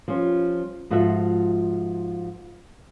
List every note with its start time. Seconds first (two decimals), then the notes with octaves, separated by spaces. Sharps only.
0.08 F3 G3 C#4 F4
0.90 G#2 F3 F4 F#4 A4 E5